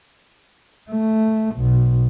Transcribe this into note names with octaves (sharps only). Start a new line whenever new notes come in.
A3
B1